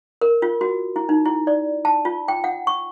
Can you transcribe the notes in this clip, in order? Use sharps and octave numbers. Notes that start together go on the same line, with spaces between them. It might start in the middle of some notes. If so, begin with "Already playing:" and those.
A#4
F4
F#4
E4
D#4
E4
D5
A5
F4
G5
F#5
C#6